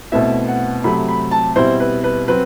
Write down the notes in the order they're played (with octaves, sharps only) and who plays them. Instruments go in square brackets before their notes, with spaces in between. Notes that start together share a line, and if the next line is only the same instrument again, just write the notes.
[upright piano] B2 A3 C4 E4 E5
F#5
C3 F#3 A3 B5
B5
A5
B2 G3 C4 E4 C5
B4
B4
F#3 C4 B4